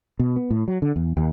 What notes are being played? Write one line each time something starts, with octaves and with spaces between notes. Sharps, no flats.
B2
B3
A2
F#3
D3
E2
D#2